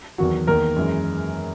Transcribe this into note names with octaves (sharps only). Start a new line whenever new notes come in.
E2 D#3 F#3 F#4
E2 D#3 A#3 A#4
F#2 E3 G#3